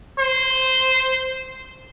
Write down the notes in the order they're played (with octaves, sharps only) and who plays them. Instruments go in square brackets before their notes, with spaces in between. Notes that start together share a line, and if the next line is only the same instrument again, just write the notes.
[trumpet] C5